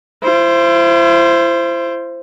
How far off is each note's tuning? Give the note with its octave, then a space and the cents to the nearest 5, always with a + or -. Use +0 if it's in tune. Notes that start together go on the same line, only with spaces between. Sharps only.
E4 +40 C5 +0